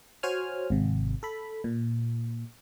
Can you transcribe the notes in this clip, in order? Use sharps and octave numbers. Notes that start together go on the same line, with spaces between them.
F#4 C5 C#5 G#5 F6
G#1 C3
A4 B5
A#2